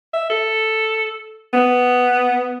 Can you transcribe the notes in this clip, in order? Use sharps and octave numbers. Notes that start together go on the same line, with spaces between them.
E5
A4
B3